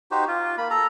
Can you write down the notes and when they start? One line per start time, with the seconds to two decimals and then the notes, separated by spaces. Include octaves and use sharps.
0.11 D#4 F#4 G4 C5
0.28 F4
0.58 A#3 B5
0.71 A4 A#5